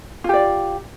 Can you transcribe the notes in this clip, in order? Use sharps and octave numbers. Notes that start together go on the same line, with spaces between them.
F4 G4 D5